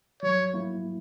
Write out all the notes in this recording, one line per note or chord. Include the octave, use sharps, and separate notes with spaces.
F#3 C#5
A#3 E4